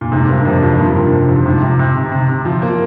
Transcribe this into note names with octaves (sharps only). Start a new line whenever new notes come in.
A#2
G#2 C3
G2 A#3
F2 C3
F2 F3
G2 A#3
C3
C3
F3
G#2 C3
C3
C3
C3
C3
C3
F3
A#3